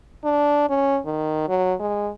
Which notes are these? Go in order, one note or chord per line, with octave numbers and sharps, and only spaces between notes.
D4
C#4
D#3
F#3
G#3